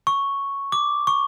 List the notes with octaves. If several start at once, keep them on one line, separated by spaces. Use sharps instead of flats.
C#6
D6
C#6